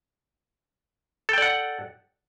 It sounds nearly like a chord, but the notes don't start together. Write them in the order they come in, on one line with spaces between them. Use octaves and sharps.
A4 G5 D5 F#5